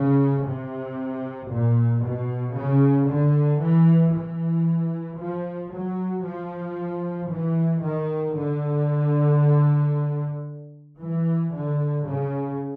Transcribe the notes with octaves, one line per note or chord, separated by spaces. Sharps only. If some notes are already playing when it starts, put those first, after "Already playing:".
Already playing: C#3
C3
A#2
B2
C#3
D3
E3
E3
F3
F#3
F3
E3
D#3
D3
E3
D3
C#3